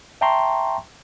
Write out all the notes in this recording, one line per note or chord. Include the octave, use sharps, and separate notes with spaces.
E5 G5 A5 A#5 C6 C#6